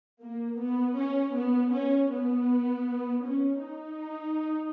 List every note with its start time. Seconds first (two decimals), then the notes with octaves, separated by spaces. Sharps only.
0.22 A#3
0.60 B3
0.98 C#4
1.36 B3
1.74 C#4
2.13 B3
3.26 C#4
3.64 D#4